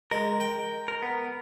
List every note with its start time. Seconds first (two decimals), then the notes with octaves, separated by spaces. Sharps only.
0.11 G#3 A#4
0.40 G5
0.88 A#4
1.02 B3